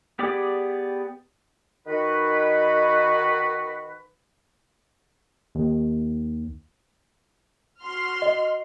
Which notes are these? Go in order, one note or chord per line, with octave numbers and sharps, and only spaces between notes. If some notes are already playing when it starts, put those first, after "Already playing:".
B3 G4 G#4 D5 D6
D#3 F#4 B4
D#2
F#4 C6 F6
D#5